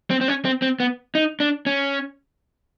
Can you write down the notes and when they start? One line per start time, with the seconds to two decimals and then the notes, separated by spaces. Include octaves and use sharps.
0.10 C4
0.21 C4
0.28 C#4
0.45 C4
0.62 C4
0.80 B3
1.15 D#4
1.40 D4
1.66 C#4